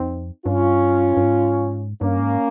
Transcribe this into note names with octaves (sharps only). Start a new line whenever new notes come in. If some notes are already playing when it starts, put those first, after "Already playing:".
Already playing: F2 C4 D#4
G2 C#4 F4
G2
G#2
G2 A#3 C#4
G#2